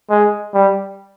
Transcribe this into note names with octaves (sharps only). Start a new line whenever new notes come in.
G#3
G3